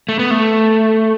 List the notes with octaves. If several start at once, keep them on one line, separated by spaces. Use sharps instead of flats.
A3
B3
A3